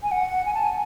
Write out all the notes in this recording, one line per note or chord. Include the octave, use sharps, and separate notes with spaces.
G#5
F#5
G#5
A5
G#5